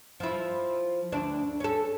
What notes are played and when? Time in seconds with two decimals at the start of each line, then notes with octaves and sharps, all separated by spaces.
0.20 F3 E4
1.12 D2 D4
1.60 C#4 A4